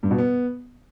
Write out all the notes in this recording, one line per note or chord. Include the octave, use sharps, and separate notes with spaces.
G2
B2
B3